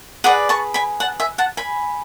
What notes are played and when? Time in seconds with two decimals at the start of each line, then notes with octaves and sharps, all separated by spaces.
0.24 G#4 B4 D5 F#5
0.49 A5 C#6
0.74 G#5 B5
1.00 F#5 A5
1.20 E5 G#5
1.38 F#5 A5
1.57 G#5 B5